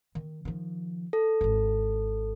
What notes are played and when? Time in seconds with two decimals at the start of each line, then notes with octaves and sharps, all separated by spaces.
0.15 D#3
0.45 D#3 F3
1.13 A4
1.41 D#1 G#1